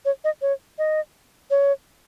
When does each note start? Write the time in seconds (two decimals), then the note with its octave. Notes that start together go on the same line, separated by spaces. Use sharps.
0.05 C#5
0.24 D#5
0.42 C#5
0.78 D#5
1.51 C#5